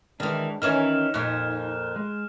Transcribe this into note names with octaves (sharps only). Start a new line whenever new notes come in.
D#3 E3 G#3 D4
D#3 E3 C#4 D#4 F6 E7
F2 A#2 F#6
G#3